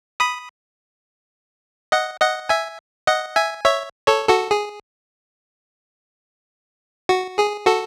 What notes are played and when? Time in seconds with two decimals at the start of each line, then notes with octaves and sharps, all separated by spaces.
0.20 B5 D#6
1.92 D#5 F#5
2.21 D#5 F#5
2.49 E5 G#5
3.07 D#5 F#5
3.36 E5 G#5
3.65 C#5 E5
4.07 A4 C#5
4.29 F#4 A4
4.51 G#4
7.09 F#4
7.38 G#4
7.66 F#4 A4